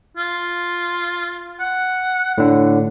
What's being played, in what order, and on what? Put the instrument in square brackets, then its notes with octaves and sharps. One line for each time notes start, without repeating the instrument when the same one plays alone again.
[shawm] F4
F#5
[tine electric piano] A2 D3